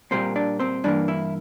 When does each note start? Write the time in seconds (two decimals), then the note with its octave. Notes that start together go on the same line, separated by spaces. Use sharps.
0.11 A#2 G3 A#3 C4 C5
0.36 D4 D5
0.59 C4 C5
0.84 G2 E3 A#3 D4 D5
1.08 E4